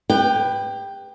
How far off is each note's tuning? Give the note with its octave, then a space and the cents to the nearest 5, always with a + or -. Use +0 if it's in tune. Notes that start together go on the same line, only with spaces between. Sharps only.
G4 +45 B4 +0 G5 +0